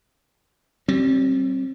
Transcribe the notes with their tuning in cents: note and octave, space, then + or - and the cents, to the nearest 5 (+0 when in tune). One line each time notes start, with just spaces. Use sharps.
G3 -30 C4 +25